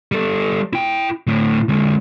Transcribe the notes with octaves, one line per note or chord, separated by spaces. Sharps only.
G3 A4
E4 G5
D2 A2
D3 G#3